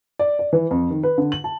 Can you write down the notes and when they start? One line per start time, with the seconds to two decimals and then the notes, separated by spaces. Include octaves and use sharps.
0.19 D5
0.39 D5
0.53 E3
0.71 F2
0.90 D#3
1.03 B4
1.18 D3
1.32 F#7
1.44 A5